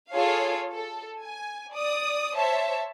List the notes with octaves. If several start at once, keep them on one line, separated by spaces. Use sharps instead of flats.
F4 G#4 A4 C#5 F5
A4
G#5
D5 D#6
C5 C#5 E5 A5